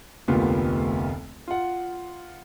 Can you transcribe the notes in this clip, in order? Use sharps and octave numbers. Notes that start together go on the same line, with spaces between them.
F1 D2 A#3 B3 F4 G4
F4 F#5